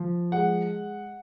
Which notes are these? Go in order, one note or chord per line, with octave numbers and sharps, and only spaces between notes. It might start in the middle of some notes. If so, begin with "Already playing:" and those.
Already playing: F3
G#3 F#5